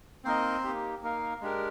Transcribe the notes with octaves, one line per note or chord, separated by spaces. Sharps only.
A#3 C4 D#4 A#4 C5 D#5
A#3 D#4 G4
A#3 D#4 A#4 F5
G#3 D4 G4 A#4